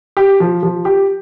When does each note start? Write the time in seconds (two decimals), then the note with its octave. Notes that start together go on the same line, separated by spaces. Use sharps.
0.17 G4
0.40 F3
0.63 F3
0.85 G4